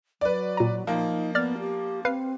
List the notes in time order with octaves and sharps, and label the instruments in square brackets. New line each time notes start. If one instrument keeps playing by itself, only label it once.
[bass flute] F#3 [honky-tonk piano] B4 D5
[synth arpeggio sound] A#2 A#5
[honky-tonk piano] F3 A#3 [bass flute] D#4
[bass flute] B3 [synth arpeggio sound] D5 F6 A6
[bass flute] G4
[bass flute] C4 [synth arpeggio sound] B4 F5 C7